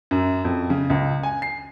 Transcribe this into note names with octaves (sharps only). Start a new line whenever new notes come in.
F#2
F2
C#3
C#2
G#5
C7